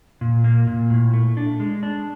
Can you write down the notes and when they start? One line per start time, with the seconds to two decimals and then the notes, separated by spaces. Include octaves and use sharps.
0.21 A#2
0.44 A#3
0.67 A#2
0.90 A2
1.14 A3
1.37 D4
1.60 G#3
1.83 D4